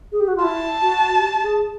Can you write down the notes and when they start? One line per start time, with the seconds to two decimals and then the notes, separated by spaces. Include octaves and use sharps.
0.12 G#4
0.20 G4
0.27 F#4
0.36 F4
0.44 E4 A5
0.81 F#4
1.18 G4
1.43 G#4